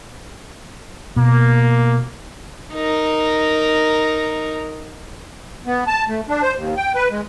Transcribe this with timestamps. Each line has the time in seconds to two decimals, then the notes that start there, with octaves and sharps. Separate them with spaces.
1.16 B2 A#3
2.74 D#4 A#4
5.67 B3
5.87 A5
6.08 A3
6.28 D4
6.42 C5
6.56 D#2
6.76 G5
6.95 B4
7.11 G#3